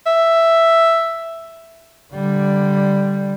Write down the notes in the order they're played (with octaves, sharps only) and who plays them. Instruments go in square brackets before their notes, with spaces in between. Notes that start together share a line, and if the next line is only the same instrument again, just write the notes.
[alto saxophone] E5
[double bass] D3 G3